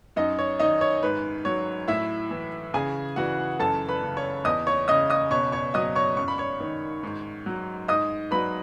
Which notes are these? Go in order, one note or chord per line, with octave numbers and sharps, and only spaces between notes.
F#2 D#4 D#5
C#5
D#3 D#4 D#5
C#5
G#2 B4
F#3 C#5
A2 E4 E5
E3
C#3 G#4 G#5
E3 F#4 F#5
F#2 A4 A5
B4 B5
C#3
C#5 C#6
E2 D#5 D#6
C#5 C#6
C#3 D#5 D#6
D#5 D#6
B2 C#5 C#6
C#5 C#6
F#3 D#5 D#6
C#5 C#6
F#2 C#6
B5
C#5 C#6
D#3
G#2
F#3
G#2 D#5 D#6
F#3 B4 B5